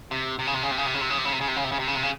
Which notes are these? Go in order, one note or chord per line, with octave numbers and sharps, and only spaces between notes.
C3
C3
C#3
C3
C#3
C3
C#3
C3
C#3
C3
C#3
C3
C#3
C3
C#3
C3
C#3
C3
C#3
C3
C#3
C3
C#3